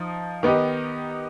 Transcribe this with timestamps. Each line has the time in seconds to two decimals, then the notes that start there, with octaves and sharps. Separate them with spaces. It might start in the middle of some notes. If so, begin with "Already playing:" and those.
Already playing: F3 D#4
0.43 D#3 B3 D#4 G4